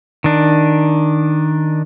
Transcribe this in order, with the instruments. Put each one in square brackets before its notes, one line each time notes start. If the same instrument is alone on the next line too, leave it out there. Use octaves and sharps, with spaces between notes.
[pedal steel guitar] D#3 D4